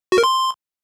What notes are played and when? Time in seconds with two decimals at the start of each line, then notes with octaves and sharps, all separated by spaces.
0.12 F#4
0.18 A#4
0.24 C6